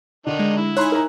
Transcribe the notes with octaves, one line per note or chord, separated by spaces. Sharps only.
D3 D#3 D4 D#4
G#3
E4
D#4 C#5 G#5 B5 C6 F#6
A#4 A#5